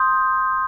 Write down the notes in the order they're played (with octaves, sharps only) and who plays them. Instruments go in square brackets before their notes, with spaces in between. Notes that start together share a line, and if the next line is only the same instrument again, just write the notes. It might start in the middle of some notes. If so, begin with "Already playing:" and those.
Already playing: [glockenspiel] C6 D#6 G6